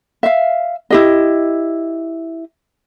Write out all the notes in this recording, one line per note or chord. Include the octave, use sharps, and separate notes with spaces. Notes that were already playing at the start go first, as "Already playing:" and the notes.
E5 F5
E4 G4 D#5